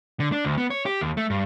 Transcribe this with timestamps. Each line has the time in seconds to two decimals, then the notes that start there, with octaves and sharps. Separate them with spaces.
0.20 D3
0.32 D4
0.45 D2
0.58 B3
0.70 C#5
0.86 G4
1.01 D#2
1.17 A3
1.30 G2